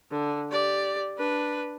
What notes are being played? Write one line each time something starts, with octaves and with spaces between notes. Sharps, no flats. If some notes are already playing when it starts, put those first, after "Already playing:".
D3
G4 D5
D4 B4